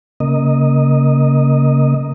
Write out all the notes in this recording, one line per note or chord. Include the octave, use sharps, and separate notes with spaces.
C#3 A#3 D#5